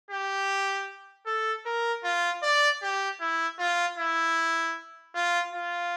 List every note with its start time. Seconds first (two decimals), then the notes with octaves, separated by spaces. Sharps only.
0.11 G4
1.27 A4
1.66 A#4
2.04 F4
2.43 D5
2.83 G4
3.21 E4
3.59 F4
3.98 E4
5.15 F4
5.53 F4